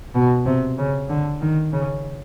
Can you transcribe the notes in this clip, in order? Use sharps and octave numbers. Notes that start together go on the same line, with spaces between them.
B2
C3
C#3
D3
D#3
C#3